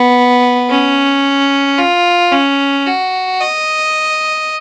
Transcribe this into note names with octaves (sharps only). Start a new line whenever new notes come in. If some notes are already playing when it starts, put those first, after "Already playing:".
Already playing: B3
C#4
F4
C#4
F#4
D#5